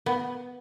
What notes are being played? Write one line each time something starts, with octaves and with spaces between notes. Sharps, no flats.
B3